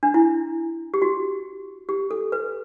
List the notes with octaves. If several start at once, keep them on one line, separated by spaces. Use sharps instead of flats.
D4
E4
G4
F#4
G4
A4
B4